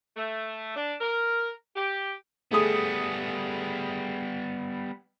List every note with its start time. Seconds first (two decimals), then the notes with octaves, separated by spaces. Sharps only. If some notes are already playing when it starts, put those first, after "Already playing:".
0.17 A3
0.75 D4
1.01 A#4
1.76 G4
2.51 G3 A3 B3 G#4 D#6